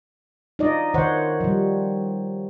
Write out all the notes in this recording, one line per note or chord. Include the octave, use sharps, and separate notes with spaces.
D#4 F4 D5 D#5
D#3 C5 C#5 F#5
F3 G3